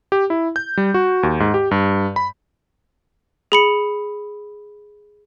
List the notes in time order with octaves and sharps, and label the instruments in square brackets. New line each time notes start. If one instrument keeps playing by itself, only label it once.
[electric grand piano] G4
E4
G6
G3
F#4
D#2
G#2
G4
G2
B5
[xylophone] G#4 B5 C#7